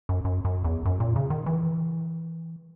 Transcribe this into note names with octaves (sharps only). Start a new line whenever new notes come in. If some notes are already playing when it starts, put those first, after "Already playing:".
F#2
F#2
F#2
E2
F#2
A#2
C#3
D#3
E3